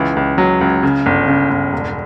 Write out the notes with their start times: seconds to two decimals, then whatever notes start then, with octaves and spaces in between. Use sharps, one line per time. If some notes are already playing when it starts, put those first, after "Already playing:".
Already playing: C#2 E3
0.17 C#2
0.38 F#3
0.61 C#2
0.83 C#3
1.06 G1
1.28 C#3
1.50 G1
1.73 E1